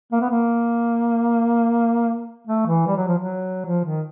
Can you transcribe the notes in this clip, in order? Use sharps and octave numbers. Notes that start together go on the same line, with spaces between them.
A#3
B3
A#3
A3
E3
G3
F#3
F3
F#3
F3
D#3